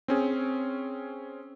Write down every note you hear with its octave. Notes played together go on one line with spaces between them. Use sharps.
C4 C#4 G#4